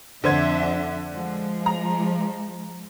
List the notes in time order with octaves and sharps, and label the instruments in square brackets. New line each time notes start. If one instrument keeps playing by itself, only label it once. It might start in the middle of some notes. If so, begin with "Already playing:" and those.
[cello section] F2 D4 E5 [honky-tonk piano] D3 C5 G#6
[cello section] F3 G#3
[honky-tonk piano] A#5